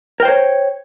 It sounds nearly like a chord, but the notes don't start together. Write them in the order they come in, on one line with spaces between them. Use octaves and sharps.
A#4 G5 C5 C#5